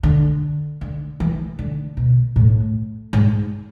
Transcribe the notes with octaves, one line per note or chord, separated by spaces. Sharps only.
D3
D3
E3
D3
B2
A2
G#2